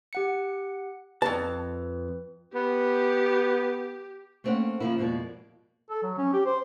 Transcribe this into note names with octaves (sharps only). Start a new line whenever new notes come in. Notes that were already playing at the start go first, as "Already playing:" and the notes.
G4 F#5 C#7
F2 B4 A5
B3 G4
A3 A#3 C4 C#4 C#5 F#5
C#3 F3 A#3 E4
F2 B2 G#3 A#3 D5
A4
F#3
C#4
G4
C5